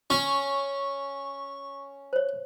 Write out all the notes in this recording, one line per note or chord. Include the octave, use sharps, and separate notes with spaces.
C#4 C#6
C5 C#5